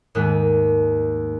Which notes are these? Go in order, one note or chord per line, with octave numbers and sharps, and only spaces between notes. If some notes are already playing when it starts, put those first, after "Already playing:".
D#2 G#2 G#3 A3 F#6